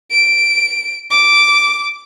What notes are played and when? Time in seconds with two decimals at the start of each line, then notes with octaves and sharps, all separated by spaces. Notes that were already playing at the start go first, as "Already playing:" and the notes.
0.11 D7
1.10 D6